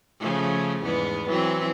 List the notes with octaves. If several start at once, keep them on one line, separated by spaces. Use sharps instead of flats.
C#3 F3 A3
E2 G#2 B3
E3 F#3 C4